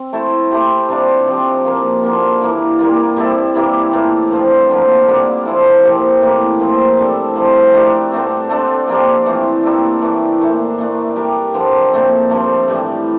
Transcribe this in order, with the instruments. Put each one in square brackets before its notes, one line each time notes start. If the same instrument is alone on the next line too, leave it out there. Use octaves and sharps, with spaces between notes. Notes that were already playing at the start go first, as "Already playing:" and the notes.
Already playing: [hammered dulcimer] C4
A3 E4 A4 C5
A3 E4 G4 C5
C3 G3 D4 F4
F3 C4 G4
A#2 F3 A#3 F4
D3 F3 A#3 F4
G2 E3 A#3 E4
A#2 G3 A#3 F4
G3 C4 E4 A4
E3 A#3 E4 G4
A2 E3 A#3 F4
G2 F3 C4 F4
D3 F3 A#3
D3 G3 A#3 D4
F3 C4 E4 A4
A#2 F3 C4 G4
A2 E3 A#3
A#2 F3 C4
A2 G3 D4 A4
C3 F3 C4
A3 D4 G4 A#4
G2 D3 A3 C4
A3 D4 A4 C5
F3 A#3 D4 G4
E3 A3 C4 F4
G3 A#3 D4 A4
E3 A3 D4
A#2 A3 E4
A#2 A3 D4
G3 D4 G4 A#4
G2 D3 F3
A#2 A3 C4
G2 F3 A3
A2 E3 G3